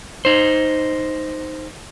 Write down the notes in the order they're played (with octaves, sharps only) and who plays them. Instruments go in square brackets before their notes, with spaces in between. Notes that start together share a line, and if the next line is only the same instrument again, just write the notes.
[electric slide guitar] D#4 C5